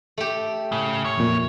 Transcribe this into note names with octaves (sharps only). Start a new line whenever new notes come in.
A3 G4
A2 C#3
C#5
F2 A#2